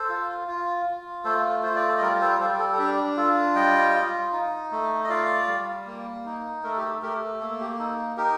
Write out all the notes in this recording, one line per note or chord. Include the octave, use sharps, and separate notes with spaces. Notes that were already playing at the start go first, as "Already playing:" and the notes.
Already playing: A4 C5
F4
F4
F4
A3 A4 C5
F4 C5
D5
A4 C5
D#5
G3 A#4 D5
A4 C5
G3 A4 C5
A4
A4
D4 G4
F4 A4
G3 D#5 G5
F4
D#4
A3
D#5
F4 D5 F5
G3
A#3
D#4
A3 A#4
A4
G4
A4
A3 G4 A#4
A#3 A4
G4
D#4 A4
D#4 G4 A#4